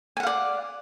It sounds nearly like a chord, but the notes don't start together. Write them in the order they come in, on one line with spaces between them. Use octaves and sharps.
G#5 F#5 F5 D5